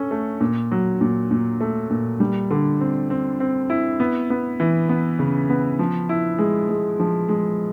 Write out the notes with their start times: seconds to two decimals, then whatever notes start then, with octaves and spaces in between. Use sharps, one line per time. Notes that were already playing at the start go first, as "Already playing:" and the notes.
Already playing: C#4 A4
0.11 A3
0.40 A#2
0.71 F#3
1.01 A#2
1.31 A#2
1.60 A3
1.90 A#2
2.20 G3
2.51 D3
2.81 C4
3.10 C4
3.40 C4
3.70 E4
4.00 B3
4.30 B3
4.60 E3
4.89 B3
5.19 C#3
5.50 B3
5.79 F3
6.09 E4
6.38 G#3
6.69 G#3
6.99 F3
7.29 G#3